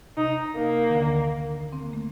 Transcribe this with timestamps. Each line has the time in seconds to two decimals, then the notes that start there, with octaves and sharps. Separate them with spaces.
0.17 C3 D#4
0.56 A#3
0.89 D#3
0.95 D2 D3
1.73 C4
1.83 A#3
1.93 A3